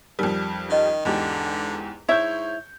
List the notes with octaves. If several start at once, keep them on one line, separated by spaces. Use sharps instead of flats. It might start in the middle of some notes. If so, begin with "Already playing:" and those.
F2 G3 D#4 A#4
D#3 C#4 D#5
E2 G#2 D3 G4
G#2 E4 C#5 E5 G6